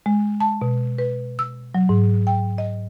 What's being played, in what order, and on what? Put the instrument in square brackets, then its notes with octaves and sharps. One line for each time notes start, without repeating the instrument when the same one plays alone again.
[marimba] G#3
A5
B2
B4
E6
F#3
G#2
G5
D#5